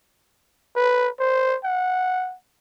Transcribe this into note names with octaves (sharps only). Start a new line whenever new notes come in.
B4
C5
F#5